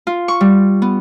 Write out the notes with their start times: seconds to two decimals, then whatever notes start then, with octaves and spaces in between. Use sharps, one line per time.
0.07 F4
0.28 C#6
0.41 G3
0.82 B3